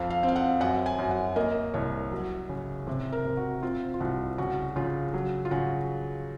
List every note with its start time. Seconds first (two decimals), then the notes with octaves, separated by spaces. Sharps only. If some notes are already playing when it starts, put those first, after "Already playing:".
Already playing: F2 F5
0.10 F5
0.23 C4
0.28 F5
0.36 F#5
0.60 F#2 F#5
0.86 G#5
0.99 F#2
1.11 F#5
1.36 A#3 D#5
1.74 C2 C#5
2.12 F#3
2.49 C#3
2.87 C3 C5
3.12 A#4
3.25 C3
3.37 F#4
3.63 C4 F4
3.94 F4
4.00 C2 F#4
4.38 C#3 F#4
4.76 C#3 F4
5.14 F#3
5.45 F4
5.51 C#3 F#4